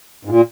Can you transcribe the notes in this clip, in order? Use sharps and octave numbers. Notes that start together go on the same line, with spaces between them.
G#2
A#2